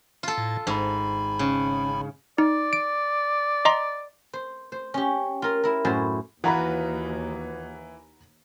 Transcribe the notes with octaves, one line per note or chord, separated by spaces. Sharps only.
F4 A4
A2
G#1 G#2 B5
C#3
D#4 D5
D7
D#5 A#5 C6
C5
C5
C#4 G4
F4 A#4
E4 A#4
F#2 A2 F#4 C5 G#5 A5
D#2 E3 F4 F#4 B4 F#5 A#5 B5